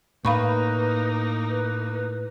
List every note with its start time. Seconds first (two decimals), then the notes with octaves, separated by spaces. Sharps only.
0.25 A2 A#3 D#4 B4 F5 B5 C#6
1.50 B4